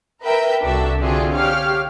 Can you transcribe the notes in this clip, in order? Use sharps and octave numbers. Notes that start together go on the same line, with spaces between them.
A#4 B4 E5 G5
C2 D4 F#4 A4 E5
D3 C4 D4 F4 F#4 G#4
G4 C#5 F5 F6